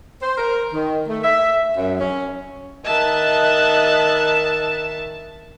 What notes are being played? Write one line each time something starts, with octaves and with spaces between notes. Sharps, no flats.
C5
A#4
D#3
A3
E5
F#2
C#4
D#3 D#5 E5 A5 F#6